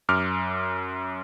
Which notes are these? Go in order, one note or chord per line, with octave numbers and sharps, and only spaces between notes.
F#2 D6 F6